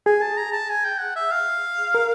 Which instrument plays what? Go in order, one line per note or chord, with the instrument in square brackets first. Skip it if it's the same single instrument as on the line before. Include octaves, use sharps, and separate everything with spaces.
[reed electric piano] G#4 [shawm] G#5
[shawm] A5
A#5
A5
G#5
G5
F#5
E5
F5
[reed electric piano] A#4